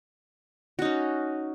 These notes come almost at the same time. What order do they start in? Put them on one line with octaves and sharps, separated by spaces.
F#4 D#4 C#4